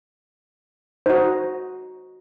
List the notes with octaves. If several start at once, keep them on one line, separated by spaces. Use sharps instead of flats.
D#4 F#4 C5